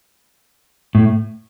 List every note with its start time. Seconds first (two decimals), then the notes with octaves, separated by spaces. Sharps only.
0.95 A2